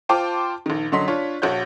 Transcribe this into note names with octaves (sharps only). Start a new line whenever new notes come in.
F4 C5 G5 A5 C6 D6
A#1 D#3
F#2 D3 F#3 D#5 C6 B6
D4 F4 C#5
A#1 F#4 C#5 G6